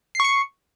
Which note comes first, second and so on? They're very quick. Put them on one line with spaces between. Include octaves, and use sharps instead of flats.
C7 C#6 C#7